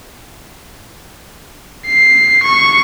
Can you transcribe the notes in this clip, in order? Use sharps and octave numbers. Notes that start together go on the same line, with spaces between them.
C7
C#6